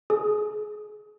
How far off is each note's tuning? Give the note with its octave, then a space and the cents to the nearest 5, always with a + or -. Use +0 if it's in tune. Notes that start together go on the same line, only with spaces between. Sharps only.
G#4 +30 D#6 -5